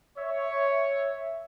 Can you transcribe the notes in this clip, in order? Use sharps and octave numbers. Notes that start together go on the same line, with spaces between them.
C#5 E5